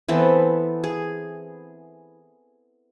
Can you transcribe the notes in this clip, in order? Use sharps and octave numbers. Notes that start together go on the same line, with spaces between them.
E3 B3 C4 A4
G#4